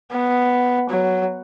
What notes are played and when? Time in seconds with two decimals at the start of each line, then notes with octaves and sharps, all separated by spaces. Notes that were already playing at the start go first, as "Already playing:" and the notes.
0.12 B3
0.89 F#3